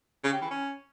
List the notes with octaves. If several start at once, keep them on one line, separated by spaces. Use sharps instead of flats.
C#3
G4
E3
C#4